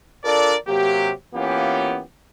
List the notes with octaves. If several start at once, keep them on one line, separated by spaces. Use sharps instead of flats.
D4 F4 A4 A#4 D5
C3 F#3 A#3 G4
E3 A#3 B3 C#4 F4 G4